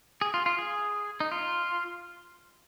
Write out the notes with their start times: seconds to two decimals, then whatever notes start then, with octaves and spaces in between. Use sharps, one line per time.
0.21 G#4
0.34 F4
0.46 F4
0.58 G#4
1.20 D#4
1.32 F4